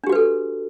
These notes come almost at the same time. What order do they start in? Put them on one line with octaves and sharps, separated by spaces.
D4 G4 F#4 B4 A4